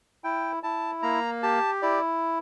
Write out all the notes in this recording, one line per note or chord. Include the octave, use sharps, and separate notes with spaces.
E4 G5
E4 A5
A#3 A#5
G4 A5
E4 D5